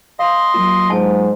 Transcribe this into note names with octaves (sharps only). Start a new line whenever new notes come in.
D#5 F5 C6
F#3 A#3 F4
G#2 G#5 A5